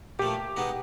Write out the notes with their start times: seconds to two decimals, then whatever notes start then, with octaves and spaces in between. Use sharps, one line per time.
0.19 A#2 F3 A3 G4
0.56 B2 G#3 B3 D#4